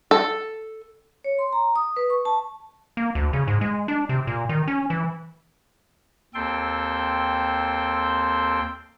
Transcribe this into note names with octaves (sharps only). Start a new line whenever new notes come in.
A4
C#5
C6
A#5
D#6
B4
C#6
A5
A#3
D2
C#3
G#2
G#3
D4
C3
A#2
D#3
C#4
E3
D#2 C4 A4 G5 C6